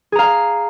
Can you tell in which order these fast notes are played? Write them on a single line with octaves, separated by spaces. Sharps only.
G#4 A#5 F5